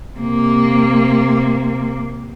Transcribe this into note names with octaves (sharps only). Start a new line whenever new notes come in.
C3 A#3